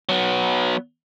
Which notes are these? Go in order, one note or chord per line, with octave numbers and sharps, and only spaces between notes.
F#3 B3